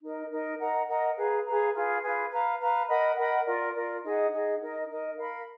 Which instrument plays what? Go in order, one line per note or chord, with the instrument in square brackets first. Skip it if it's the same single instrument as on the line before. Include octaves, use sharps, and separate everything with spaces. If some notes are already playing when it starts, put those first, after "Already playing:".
[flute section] D#4 A#4 D#5
D#4 A#4 D#5
A#4 D#5 F#5 A#5
A#4 D#5 F#5 A#5
G#4 B4 F5 A#5
G#4 B4 F5 A#5
F4 G#4 B4
F4 G#4 B4
B4 F5 A#5
B4 F5 A#5
A#4 D#5 F#5 B5
A#4 D#5 F#5 B5
F4 A#4 D5
F4 A#4 D5
D#4 G#4 D#5 F#5
D#4 G#4 D#5 F#5
D#4 A#4 D#5
D#4 A#4 D#5
A#4 F5 B5